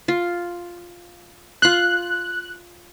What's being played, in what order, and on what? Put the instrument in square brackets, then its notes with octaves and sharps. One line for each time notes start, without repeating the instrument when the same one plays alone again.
[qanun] F4
[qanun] F4 C6 [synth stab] F#6